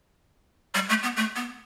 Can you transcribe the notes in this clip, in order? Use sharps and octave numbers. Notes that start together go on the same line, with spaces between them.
G3
A3
B3
A3
B3